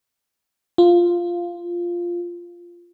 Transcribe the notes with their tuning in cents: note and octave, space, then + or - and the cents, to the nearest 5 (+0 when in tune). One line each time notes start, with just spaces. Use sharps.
F4 -5